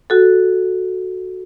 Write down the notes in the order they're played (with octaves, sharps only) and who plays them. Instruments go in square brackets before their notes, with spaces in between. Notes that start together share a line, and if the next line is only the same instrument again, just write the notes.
[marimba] F#4 A4